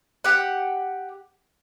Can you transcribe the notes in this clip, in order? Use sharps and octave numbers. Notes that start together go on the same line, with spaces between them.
G4 F#5